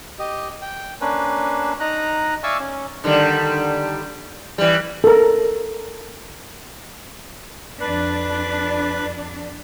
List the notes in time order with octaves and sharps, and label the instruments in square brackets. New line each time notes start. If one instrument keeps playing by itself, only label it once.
[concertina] G4 D#5
G5
A#3 C#4 D4 B4
D#4 A#5 F#6
D5 E5 F5 G#5 C#6 E6
C#4
[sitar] D3 D#3 G3
E3 G3
[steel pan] A4 A#4
[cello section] F2 D4 [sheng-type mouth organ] B4 F#6